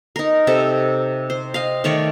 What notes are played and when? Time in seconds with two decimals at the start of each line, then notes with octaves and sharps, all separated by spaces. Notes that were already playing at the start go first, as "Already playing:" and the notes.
0.16 D#4 A#4
0.47 C3 A4
1.30 C5
1.54 D#5 F5
1.84 D#3 A3 C#5 D5